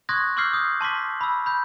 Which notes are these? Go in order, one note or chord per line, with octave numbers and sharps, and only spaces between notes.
C6 C#6 D#6 F#6 G#6 A#6
C6 D6 E6 F6 G6 C7
D#6 G6
A5 C6 D6 B6
B5 E6
B5 G6